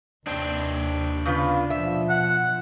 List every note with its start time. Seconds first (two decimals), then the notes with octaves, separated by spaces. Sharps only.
0.27 D#2 C3 D4 C5 G5
1.25 C#3 B3 F4
1.70 B2 F3 E5
2.10 F#5